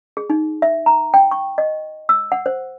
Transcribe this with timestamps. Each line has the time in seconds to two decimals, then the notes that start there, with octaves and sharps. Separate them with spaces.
0.17 G#4
0.30 D#4
0.62 E5
0.86 A#5
1.14 G5
1.31 C#6
1.58 D#5
2.09 E6
2.32 F#5
2.46 C5